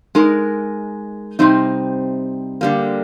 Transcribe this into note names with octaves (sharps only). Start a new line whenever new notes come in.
G#3 D#4 A#4
C3 G3 C4 D#4
D3 G3 A#3